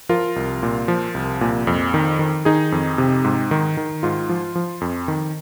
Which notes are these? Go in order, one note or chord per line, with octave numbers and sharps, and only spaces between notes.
F3 F4 A#4
C2
A#2
F3
C2
A#2
F2
D#3
D#3
D#3 D#4 G#4
F2
C3
G#2
D#3
D#3
G#2 F4
F3
F3
F2
D#3